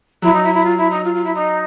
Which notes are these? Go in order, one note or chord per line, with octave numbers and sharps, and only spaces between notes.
F#3 E4
D#4
E4
E4
F4
E4
D#4
F4
F4
E4
D#4